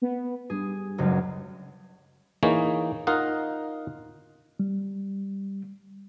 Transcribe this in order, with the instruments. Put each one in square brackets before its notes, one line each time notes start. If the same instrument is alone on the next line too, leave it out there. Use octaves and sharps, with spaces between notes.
[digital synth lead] B3
[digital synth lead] G2 [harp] G#4
[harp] F#1 C#2 F#2
[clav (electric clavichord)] E3 A#3 D#4 G#4 C#5
D#4 F4 A#4 D#5 F5 F#5
[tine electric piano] G3